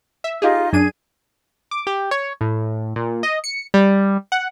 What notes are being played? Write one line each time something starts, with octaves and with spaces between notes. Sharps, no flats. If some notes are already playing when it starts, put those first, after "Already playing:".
E5
D#4 F4 G4 G#4 D#5
F#2 D4 G#4 D#7
D6
G4
C#5
A2
A#2
D#5
C#7
G3
F#5